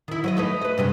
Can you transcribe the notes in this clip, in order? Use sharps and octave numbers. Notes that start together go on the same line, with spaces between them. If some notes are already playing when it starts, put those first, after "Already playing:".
D#3 E4
F#3 B4 D#5
A3 D#4 B4
B4 D#5
G2 C3 G#3